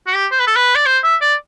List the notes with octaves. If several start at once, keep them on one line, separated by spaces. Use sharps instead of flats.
F#4
G4
C5
B4
A4
B4
D5
C5
E5
D5